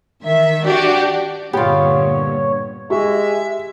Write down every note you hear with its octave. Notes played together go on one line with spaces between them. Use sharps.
D#3 E5
D4 F#4 G4 D5
G2 A#2 D3 B3 F4 G4 C#5
G#3 G4 E5 C#6